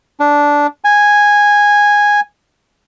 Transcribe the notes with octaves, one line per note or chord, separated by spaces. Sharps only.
D4
G#5